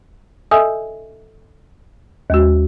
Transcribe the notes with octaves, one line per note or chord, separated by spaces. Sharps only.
A4 D#5 E5 G#5 D#6 E6
D#2 G#3 F#4